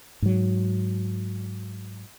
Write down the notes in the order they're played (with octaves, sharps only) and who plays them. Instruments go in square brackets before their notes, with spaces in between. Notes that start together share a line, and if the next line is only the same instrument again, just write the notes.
[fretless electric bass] G#2 F#3